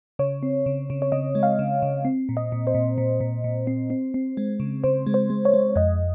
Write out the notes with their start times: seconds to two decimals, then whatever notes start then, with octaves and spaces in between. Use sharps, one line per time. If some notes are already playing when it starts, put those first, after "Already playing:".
0.19 C#3 C#5
0.43 C4
0.66 C#3
0.90 C#3
1.02 C#5
1.12 C#3 D#5
1.35 G#3
1.43 F5
1.59 C#3
1.82 C#3
2.05 C4
2.29 A#2
2.37 D#5
2.52 A#2
2.67 C5
2.74 A#2
2.98 A#2
3.21 A#2
3.44 A#2
3.67 C4
3.90 C4
4.14 C4
4.37 G#3
4.60 C#3
4.84 C#3 C5
5.06 G#3
5.14 C5
5.30 G#3
5.45 C#5
5.54 G#3
5.76 F2 D#5